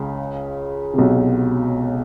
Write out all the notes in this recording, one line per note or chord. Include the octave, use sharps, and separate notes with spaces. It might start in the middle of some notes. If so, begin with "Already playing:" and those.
Already playing: C#2 C#3
C3
B1 B2